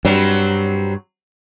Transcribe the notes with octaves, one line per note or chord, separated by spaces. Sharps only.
G2 F#3 G3 C4